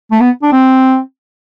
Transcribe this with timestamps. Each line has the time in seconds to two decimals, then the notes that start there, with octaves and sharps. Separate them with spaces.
0.11 A3
0.20 B3
0.43 D4
0.52 C4